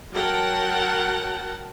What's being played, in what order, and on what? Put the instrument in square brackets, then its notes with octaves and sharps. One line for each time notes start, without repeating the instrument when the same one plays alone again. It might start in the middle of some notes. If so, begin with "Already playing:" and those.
[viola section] F#3 A#4 F#5 G5 A5